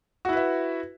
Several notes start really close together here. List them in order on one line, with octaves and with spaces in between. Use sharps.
F#4 E4 B4 E5